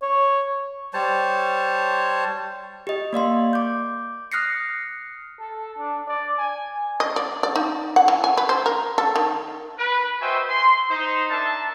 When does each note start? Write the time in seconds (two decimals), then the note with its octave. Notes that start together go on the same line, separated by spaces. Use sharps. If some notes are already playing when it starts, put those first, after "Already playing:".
0.02 C#5
0.94 G3 C5 C#5 A5
2.87 G4 D#5
3.13 A#3 D5 F5 C6
3.53 D6 G6
4.32 D#6 F6 F#6 A#6 C7 C#7
5.40 A4
5.78 D4
6.07 D5
6.38 G#5
7.00 D#5
7.16 D5
7.43 D5
7.56 D#4
7.96 F#5
8.08 E3
8.24 G#5
8.37 B4
8.49 C5
8.66 A#4
8.98 A4
9.16 D#3
9.79 B4
10.21 F#4 C5 D#5 E5 G5 G#5
10.49 C6
10.90 D#4 C5
11.30 D4 A#4 E5 A5